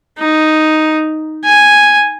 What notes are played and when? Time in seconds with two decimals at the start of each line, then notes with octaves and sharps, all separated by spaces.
0.19 D#4
1.45 G#5